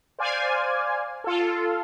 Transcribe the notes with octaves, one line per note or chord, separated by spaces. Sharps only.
C5 D5 F5 G#5
F4 A4